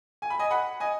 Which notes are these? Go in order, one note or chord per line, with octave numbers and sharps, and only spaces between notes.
G#5
B5
D#5 G#5
F#5 B5
D#5 G#5